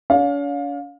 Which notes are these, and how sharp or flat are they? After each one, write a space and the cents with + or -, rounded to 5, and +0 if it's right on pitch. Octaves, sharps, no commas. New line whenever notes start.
C#4 +45 F5 +25